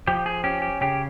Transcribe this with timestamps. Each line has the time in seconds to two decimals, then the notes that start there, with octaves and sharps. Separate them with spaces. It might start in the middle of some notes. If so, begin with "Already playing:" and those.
0.07 F3 G4
0.26 G#4
0.44 C#4 G4
0.62 G4
0.81 C#3 G4